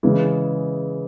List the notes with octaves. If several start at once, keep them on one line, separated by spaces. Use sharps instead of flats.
C#3 E3 G#3